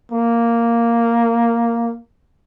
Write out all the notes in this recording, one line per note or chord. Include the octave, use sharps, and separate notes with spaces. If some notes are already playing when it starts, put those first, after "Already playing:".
A#3